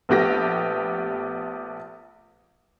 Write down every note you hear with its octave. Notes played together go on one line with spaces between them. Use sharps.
A#1 A3 B3 G4 A#6